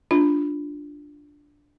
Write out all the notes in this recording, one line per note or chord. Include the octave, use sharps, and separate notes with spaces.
D4 F4